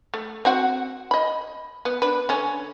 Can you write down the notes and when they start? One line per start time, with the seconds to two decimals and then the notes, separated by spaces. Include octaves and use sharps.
0.14 A3
0.45 C4 F#4 F#5
1.11 D#5 B5
1.85 B3
2.02 D4 B4
2.29 D3 C#4